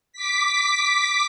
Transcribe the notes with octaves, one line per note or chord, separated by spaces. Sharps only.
D6 B6